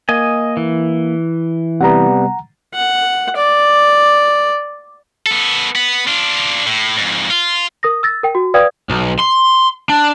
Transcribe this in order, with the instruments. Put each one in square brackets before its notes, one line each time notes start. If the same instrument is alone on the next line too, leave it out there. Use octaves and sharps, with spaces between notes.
[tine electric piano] A#3 [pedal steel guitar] D#5 G#5
[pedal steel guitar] E3
[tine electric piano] C3 G3 B3 [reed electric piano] F#5 A#5
[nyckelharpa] F#5
D5
[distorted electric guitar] B3 A4
B3
D4 F4
A2
F2 G#2
F4
[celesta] A#4 D#6 A#6
E6 A6 A#6
A#4 G5
F#4
B4 D5 F5 G5 D#6 G#6
[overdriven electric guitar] B1
C6
D4